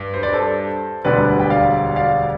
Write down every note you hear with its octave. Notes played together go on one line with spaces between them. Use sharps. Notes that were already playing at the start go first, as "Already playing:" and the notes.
Already playing: G2
C5
D5
A4 C5
E1 D2 D3 G3 B4 D5
G5
D5 F5
D5 F5